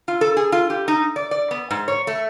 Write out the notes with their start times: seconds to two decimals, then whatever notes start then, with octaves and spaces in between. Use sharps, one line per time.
0.08 F4
0.21 A4
0.37 G#4
0.52 F4
0.70 G4
0.88 D#4
1.16 D5
1.31 D5
1.51 B3
1.71 G#2
1.88 C#5
2.07 A3